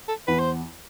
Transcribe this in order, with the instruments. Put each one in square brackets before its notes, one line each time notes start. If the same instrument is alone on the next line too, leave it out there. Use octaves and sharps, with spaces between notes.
[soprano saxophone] A4
[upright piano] E2 [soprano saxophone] B4
[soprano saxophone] C5